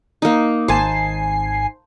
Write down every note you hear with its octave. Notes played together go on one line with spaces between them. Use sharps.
A#3 D#4
G#1 C5 G#5 A5 C7